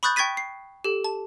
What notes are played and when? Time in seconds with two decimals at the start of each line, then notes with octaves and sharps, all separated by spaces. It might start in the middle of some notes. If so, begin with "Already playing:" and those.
0.03 B5 C#6 D#6 F#6 G6 A6
0.16 G5 C#6 G#6 A6 B6 D#7
0.37 C7
0.84 G4 A4
1.04 A5